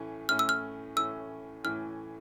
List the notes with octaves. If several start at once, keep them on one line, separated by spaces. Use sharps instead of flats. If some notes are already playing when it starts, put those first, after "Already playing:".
Already playing: A2 E3 A3 C#4
A2 E3 A3 C#4 F6
E6
F6
A2 E3 A3 C#4 E6
A2 E3 A3 C#4 F6